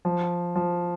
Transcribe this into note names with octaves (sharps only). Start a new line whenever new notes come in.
F3
F3